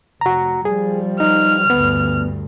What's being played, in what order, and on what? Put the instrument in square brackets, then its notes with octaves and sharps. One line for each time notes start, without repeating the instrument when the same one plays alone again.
[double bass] F1 [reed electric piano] F#4 A#5
[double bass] F3 G3 [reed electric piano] G#4
[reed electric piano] D#4 [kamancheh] F6
[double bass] D2 G2 [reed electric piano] B3